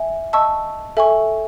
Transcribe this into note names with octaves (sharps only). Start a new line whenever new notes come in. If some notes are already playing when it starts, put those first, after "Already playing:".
Already playing: E5 G#5
D#5 A5 C#6 E6
A4 E5 G#5 C#6